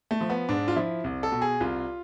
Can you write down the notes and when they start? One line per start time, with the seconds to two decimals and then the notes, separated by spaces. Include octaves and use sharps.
0.11 A3
0.21 F3
0.30 B3
0.49 G#2 D4
0.68 F4
0.76 F3 E4
1.04 C2
1.23 A4
1.32 B2
1.42 G#4
1.60 C2 F4